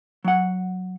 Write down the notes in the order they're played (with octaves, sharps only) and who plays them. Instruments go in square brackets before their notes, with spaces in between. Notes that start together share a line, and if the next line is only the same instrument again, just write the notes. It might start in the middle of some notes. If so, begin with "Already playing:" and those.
[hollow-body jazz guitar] F#3 F#5